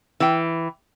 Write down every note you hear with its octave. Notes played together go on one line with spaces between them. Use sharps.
E3 G5